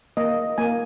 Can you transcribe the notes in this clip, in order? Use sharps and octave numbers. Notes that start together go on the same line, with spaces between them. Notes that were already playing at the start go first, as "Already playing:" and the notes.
A#3 D#5
A#3 G#5